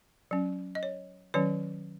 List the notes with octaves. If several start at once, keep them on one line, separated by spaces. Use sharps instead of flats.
F#3 C#4
D#5
C#5
D#3 F#3 C#4 C#5